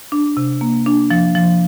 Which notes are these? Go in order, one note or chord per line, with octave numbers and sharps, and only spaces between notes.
D4
C3
A#3
D4
F3
F3